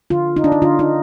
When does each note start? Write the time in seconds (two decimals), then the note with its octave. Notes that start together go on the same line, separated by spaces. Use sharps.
0.10 D3 F4
0.36 D3 D#4
0.44 D4
0.52 D#4
0.62 D3 F4
0.79 D#4